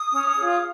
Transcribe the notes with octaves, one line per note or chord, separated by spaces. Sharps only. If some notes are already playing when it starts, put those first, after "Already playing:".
Already playing: D#6
C#4
F4 G#4 C#5